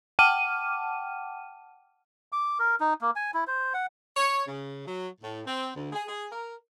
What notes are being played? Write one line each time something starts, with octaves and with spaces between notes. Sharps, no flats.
F#5 G5 A5 D6 F6 D#7
D6
A#4
D#4
A#3
G#5
E4
C5
F#5
C#5
C#3
F#3
A2
C4
D2
G#4
G#4
A#4